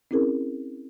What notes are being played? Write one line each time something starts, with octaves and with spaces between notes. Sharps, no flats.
C4 C#4 E4 G#4 A#4